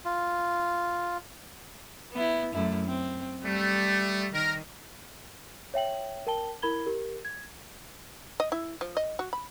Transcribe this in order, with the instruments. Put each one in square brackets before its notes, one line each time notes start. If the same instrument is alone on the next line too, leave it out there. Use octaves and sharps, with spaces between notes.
[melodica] F4
[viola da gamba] B3 E4
F#2 A3 E4
C4
[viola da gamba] G3 [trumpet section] A3
[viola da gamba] D#3 [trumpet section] A#4
[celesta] C#5 E5 G5 F#7
A#4 G5 A5 G7
E4 A#4 B5 G#6 G7
G4 A#4
G#6
[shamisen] D#5
E4
F3
D#5
F#4
B5